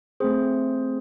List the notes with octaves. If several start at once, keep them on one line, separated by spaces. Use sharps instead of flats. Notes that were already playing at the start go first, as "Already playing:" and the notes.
A3 C4 G#4 C5